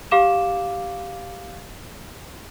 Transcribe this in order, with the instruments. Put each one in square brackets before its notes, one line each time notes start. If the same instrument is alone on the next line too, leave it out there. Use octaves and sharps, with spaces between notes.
[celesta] G4 F5 D6 E7